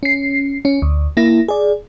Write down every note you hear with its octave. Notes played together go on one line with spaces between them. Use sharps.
C#4 C7
C#4
D2
A#3 E4 A#6
G#4 D5